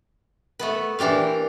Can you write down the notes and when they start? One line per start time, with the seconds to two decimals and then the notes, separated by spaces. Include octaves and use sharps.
0.59 A3 B3 B4
0.99 A#2 E3 D4 G4 F5